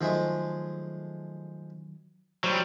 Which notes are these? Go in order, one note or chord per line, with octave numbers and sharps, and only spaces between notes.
D#3 F3 F#3 G#3 A3
F#3 G3 C5 B5